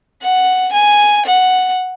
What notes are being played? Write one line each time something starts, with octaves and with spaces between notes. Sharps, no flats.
F#5
G#5
F#5